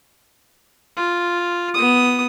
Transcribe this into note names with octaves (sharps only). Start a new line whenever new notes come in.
F4
B3 D#6